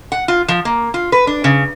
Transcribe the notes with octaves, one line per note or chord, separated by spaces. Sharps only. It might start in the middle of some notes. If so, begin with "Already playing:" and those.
F#5
F4
F3
A#3
F4
B4
D4
C#3